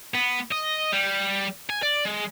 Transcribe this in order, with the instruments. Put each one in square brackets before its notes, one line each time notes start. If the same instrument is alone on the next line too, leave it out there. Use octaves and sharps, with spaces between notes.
[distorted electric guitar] B3
D#5
G3
G#5
D5
G#3